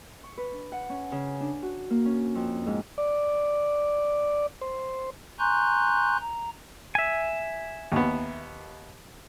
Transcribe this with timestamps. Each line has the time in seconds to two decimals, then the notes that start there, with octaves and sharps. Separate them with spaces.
0.23 C#6
0.38 B4
0.52 D4
0.72 F#5
0.89 C#4
1.12 C#3
1.40 D4
1.62 F#4
1.90 A#3
2.05 C#4
2.35 F2
2.66 G#2
2.98 D5
4.61 C5
5.39 G#5 A#5 C6 C#6 F#6 G6
6.21 A#5
6.95 E5 G#5
7.92 D#2 B3